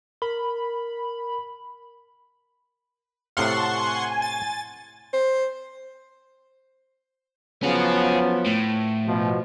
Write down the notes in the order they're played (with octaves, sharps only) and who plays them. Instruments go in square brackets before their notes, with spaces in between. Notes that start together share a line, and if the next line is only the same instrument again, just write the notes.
[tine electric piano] A#4 [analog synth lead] B5
[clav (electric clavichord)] A2 C3 F5 [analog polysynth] F#5 C6 C#6 [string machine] A5
[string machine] G#5
[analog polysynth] A6
[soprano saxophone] C5
[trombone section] F3 F#3 B3 [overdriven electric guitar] C#4 G#4
[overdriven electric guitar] A2
[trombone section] B2 F3